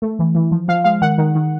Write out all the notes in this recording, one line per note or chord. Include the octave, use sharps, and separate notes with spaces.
A3
E3
E3
F3
F3 F5
G#3 F5
D#3 F#5
D#3
D#3